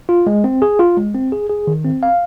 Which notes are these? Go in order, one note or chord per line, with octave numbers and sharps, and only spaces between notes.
F4
G#3
C4
G#4
F4
G#3
C4
G#4
G#4
D#3
C4
F5